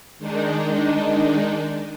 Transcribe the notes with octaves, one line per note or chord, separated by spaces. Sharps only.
D#3 G#3 D4 D#4